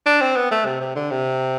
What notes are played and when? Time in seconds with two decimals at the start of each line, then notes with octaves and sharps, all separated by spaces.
0.06 D4
0.21 C4
0.36 B3
0.51 A3
0.65 C3
0.80 C3
0.95 D3
1.11 C3